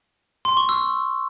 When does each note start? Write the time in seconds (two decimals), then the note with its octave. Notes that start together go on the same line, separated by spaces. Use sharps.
0.45 C6
0.57 C#6
0.69 E6